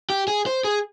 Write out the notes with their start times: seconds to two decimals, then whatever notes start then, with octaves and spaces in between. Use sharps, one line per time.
0.10 G4
0.28 G#4
0.46 C5
0.64 G#4